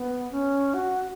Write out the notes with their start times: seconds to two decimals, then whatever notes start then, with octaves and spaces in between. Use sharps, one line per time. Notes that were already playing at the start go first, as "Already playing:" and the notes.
Already playing: B3
0.31 C#4
0.74 F#4